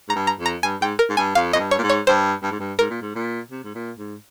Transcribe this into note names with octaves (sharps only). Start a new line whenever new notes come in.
G#2 A#5
G2
A#5
F2
A#5
G2 G#5
G#2 G5
A#4
G#2
G2 G#5
F2 F5
F2 D#5
G2
C#5
A#2
G#2
C#5
G2 C5
G2
G#2
G2
G#2 A#4
A#2
G#2
A#2
C3
G#2
A#2
G#2